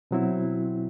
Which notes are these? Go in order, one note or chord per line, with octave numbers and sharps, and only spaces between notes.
B2 F#3 C4 E4